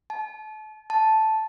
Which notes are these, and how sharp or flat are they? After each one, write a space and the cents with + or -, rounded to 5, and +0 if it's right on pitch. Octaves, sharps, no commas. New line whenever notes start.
A5 -35
A5 -5